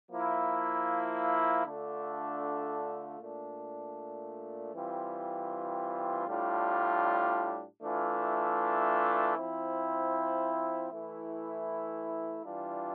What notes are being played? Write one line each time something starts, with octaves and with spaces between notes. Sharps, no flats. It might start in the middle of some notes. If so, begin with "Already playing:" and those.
F3 A#3 E4
D3 A3 D4 F4
A#2 A3 D4
E3 G3 C4 F4
A2 G3 D4 F4
E3 A3 D4 F4
F3 C4 E4
E3 A3 E4
E3 G3 D4 F4